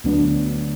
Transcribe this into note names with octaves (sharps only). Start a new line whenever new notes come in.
D2 D3 F#3 B3 D4